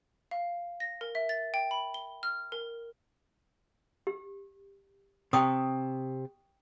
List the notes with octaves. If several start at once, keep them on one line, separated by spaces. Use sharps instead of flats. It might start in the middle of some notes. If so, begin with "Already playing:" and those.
F5
A#6
A#4
E5
A6
G5
B5
G7
F6
A#4
G4
C3 G5 C#6 D#6